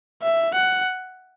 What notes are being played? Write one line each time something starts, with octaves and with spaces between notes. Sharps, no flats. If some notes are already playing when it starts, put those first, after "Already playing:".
E5
F#5